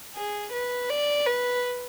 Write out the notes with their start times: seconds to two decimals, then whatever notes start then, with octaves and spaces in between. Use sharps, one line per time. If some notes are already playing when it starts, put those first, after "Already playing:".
0.15 G#4
0.53 B4
0.90 D5
1.26 B4